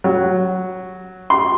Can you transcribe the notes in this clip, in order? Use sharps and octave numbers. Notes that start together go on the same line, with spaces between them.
F#3
C6